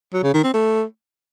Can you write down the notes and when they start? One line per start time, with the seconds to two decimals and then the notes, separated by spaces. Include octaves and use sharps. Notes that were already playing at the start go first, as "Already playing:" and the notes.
0.13 F#3
0.23 C#3
0.34 D#3
0.44 C4
0.54 A3